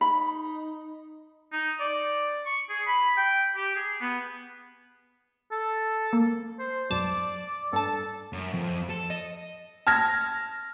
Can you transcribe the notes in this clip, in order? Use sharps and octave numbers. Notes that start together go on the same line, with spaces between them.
D#4 B5
D#4
D5
C#6
G#4
B5
G5
G4
G#4
B3
A4
A#3
C5
B1 F#2 D5 A5
G2 A4 A5
F#2
F2
A4
D#5
A5 F6 G#6 A#6